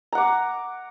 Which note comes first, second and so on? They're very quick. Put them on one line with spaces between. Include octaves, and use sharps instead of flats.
A#5 F#5 D6